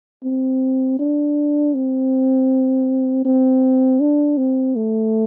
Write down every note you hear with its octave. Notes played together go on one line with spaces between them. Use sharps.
C4
D4
C4
C4
D4
C4
A3